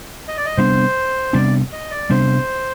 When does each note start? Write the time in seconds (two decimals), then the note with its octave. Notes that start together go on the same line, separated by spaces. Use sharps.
0.28 D#5
0.37 D5
0.46 D#5
0.57 C3 G3 B3 D4 C5
1.33 C3 G3 B3 D4 D5
1.72 D#5
1.91 D5
2.10 C3 G3 B3 D4 C5